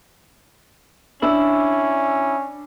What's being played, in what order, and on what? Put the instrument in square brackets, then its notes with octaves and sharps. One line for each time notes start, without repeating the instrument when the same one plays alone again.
[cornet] C#4 [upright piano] D4 E6 [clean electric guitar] E4